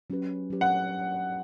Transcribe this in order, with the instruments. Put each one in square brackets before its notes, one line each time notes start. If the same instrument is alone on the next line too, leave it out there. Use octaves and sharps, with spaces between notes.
[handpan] F#3 C#4 G4 B4
F#3 C#4 G4 B4
[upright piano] F#5